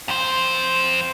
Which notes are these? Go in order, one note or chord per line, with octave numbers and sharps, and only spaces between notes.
F2 C5